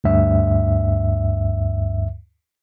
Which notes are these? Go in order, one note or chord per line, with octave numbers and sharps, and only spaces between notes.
D2 G2 E5